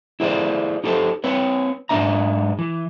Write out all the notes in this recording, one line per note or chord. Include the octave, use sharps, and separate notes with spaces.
E4 G#4 C5 D5
D#4 G4 A4 C5
C4 B4 C#5
G#2 G#3 A3 D4 E5 A#5
E3